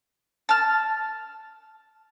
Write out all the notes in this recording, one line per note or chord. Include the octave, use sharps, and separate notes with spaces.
A5 F6